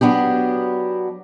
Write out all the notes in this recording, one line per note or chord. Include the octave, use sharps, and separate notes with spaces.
F#3 B3 D4 G4